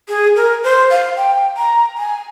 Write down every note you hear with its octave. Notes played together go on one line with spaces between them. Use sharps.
G#4
A#4
C5
F5
G5
A#5
G#5